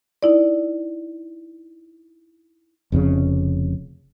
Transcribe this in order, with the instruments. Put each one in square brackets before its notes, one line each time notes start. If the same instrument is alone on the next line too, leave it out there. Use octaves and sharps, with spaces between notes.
[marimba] D#4 E4 D5
[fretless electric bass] F1 F2 A#2 C#3